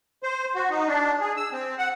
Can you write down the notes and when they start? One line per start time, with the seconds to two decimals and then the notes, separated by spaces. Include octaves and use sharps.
0.23 C5
0.55 F#4
0.70 D#4
0.88 D4
1.20 G#4
1.37 E6
1.52 C4
1.78 F#5